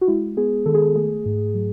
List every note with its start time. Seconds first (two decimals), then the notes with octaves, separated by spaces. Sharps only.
0.01 F#4
0.08 G#3 E4
0.37 B3 G#4
0.66 D#3 A4
0.74 G#4
0.82 A4
0.96 A3 G#4
1.26 G#2
1.54 F#3